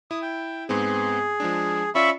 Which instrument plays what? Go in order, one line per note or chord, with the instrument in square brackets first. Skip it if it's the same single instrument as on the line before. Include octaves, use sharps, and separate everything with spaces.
[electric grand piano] E4 [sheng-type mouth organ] D#6
[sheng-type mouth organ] G5
[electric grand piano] G#2 B3 C4 [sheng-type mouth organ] G#4
[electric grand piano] F3 G#3 D4
[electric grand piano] C#4 F4 D5 [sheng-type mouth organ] E5 B5 C#6